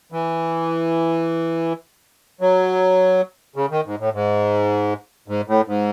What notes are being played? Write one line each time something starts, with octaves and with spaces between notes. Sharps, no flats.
E3
F#3
C#3
D#3
G#2
A2
G#2
G#2
A2
G#2